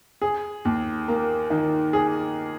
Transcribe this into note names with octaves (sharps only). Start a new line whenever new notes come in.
G#4
D#2
A#3
D#3
G#4